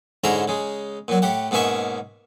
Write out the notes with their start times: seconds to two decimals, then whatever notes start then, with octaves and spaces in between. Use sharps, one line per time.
0.24 G#2 D3 C#4 E4 A#5 C6
0.48 C#3 G#3
1.08 A#2 F#3
1.22 A2 G4 F#5
1.51 G#2 B2 A#3 C#4 E5 C#6